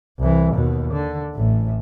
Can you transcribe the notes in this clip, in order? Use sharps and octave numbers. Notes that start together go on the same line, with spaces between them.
C2 E3
D#2 B2
D3
A1 A2